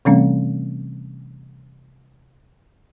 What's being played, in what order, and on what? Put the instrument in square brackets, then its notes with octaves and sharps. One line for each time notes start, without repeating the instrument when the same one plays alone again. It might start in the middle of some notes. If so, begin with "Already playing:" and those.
[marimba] C3 E3 G3 A3 C4 C#4